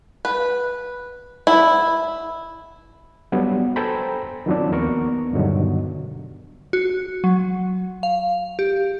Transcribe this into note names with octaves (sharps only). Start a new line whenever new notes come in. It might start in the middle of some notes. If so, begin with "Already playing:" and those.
B4
E4
F#3 G3 B3 D4
A4 C5 G5 G#5 A#5 B5
D#3 F3 F#3 C4 D4
D#2 B3 A#4 C#6
G2 B2 D3 D#3 F#3
F#4
F#3
F5
G4